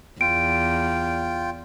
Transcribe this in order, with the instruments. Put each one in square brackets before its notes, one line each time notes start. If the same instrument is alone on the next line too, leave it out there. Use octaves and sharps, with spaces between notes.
[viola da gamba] E2 [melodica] F4 G5 [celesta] D7